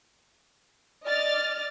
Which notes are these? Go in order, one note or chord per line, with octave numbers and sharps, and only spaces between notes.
D5 D#5 F6 A6